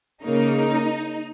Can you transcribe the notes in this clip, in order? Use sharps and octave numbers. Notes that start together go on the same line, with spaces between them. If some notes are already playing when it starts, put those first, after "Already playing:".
C#3 A#3 D#4